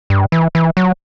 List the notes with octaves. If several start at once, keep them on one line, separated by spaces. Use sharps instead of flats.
G2
E3
E3
F#3